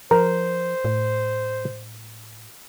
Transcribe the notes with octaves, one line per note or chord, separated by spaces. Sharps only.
F3 A#4 C5
A2